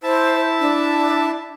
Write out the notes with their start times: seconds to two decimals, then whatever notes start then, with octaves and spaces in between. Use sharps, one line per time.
0.03 E4 C5 E5 A5
0.60 D4